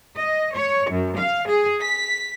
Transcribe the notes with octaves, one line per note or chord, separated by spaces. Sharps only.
D#5
C#5
F#2
F5
G#4
B6